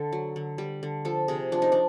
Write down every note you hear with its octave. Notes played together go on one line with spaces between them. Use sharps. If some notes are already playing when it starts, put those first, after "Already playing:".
Already playing: D3 A4
F#3
D3
G3
D3
F3 A4
C3 G#4
F3 D4
D#4
D4